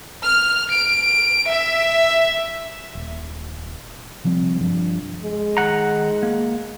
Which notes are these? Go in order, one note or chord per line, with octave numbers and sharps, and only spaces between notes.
F6
D7
E5
D#1
C3 F3 G3 C4
G2 F3
G#3
D#3 F#5 A#5
A#3